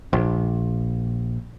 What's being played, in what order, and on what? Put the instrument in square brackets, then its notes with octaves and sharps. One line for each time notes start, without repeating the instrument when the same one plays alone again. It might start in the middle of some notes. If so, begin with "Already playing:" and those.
[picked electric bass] A#1